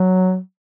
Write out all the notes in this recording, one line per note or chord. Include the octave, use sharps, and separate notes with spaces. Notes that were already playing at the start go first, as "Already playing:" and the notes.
Already playing: F#3